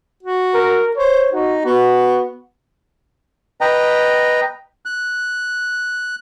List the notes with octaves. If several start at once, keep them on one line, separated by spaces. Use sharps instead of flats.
F#4
A#4
C5 C#5
D#4 F#4
B3 F#4
B4 D#5 G5 A#5
F#6